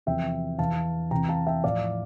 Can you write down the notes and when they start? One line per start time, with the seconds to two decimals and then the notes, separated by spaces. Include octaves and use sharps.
0.06 E2 C3 F3 E5 G5
0.58 E2 E3 F5 A5
1.11 E2 C3 E3 G5 A#5
1.29 F5 A5
1.47 E5 G5
1.64 A2 F3 D5 F5